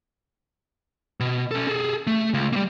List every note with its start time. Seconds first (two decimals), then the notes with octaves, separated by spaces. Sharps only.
1.20 B2
1.51 C#4 A4
1.68 G#4 A4
2.07 A3
2.34 C#2
2.53 G3 A#3